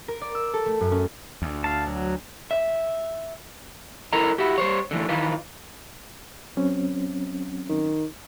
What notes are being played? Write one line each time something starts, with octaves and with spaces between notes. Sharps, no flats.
A#4
D5
E6
A4
A3
F#2
C#4
D2
F5 A5
F#3
E5
E4 A4 A#4 D#5 A#5
E4 F#4 G4
G3 C5 C#5
D3 E3 A3
D#3 E3 D#4 F4 B4
F#3 C4 C#4
D#3